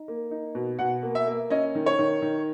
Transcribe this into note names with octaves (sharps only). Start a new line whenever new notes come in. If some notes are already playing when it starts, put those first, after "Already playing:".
Already playing: D#4
A#3
D#4
B2
B2 F#5
A#3
E5
A#3
C#4 D#5
D#3
C#5
D#3
D#3